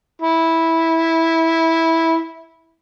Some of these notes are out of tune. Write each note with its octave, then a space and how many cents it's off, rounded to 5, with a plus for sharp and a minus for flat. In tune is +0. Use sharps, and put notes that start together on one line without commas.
E4 -10